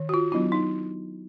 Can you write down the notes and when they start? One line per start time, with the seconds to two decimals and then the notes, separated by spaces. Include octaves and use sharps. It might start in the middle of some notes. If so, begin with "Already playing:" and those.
Already playing: D#3
0.09 F#4
0.14 F4
0.32 F#3 B3 D4 E4
0.52 D#4